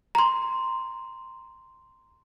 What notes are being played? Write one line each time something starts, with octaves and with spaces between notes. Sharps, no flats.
A#5 C6